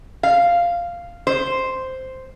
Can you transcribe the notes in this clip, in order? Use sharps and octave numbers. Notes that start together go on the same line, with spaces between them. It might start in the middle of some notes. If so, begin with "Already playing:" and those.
F5
C5